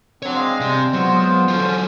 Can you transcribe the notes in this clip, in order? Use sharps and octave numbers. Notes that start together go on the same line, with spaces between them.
C4 D4 C#5 F#5
G#3 F5
C3 G3 C4
F#3 G#3 B3 F4 C5
C5
D3 F#3 C#4 F4